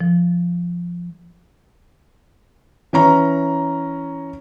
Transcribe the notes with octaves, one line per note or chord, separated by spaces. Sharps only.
F3
E3 C#4 A#5